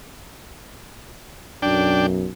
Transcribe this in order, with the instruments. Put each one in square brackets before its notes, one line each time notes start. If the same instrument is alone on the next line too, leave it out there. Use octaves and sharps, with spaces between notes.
[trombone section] B1 F#2 [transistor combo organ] D4 G5